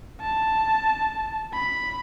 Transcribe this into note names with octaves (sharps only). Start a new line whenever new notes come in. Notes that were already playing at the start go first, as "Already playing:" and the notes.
A5
B5